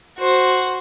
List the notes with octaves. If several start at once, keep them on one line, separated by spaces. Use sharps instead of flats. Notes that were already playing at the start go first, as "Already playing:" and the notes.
F#4 C5